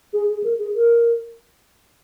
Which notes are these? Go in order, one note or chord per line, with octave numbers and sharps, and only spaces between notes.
G#4
G#4
A#4
G#4
A#4